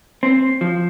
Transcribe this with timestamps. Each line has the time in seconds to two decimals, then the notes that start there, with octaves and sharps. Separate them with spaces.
0.23 C4
0.61 F3